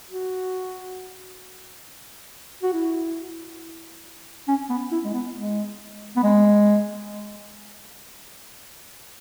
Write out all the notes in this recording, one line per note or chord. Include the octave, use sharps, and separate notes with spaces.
F#4
F#4
E4
C#4
B3
E4
G#3
B3
G#3
B3
G#3